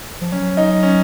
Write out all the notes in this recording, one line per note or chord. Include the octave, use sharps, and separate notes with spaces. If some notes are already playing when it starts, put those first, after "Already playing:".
F3
F#3 C#4
D#4
C#4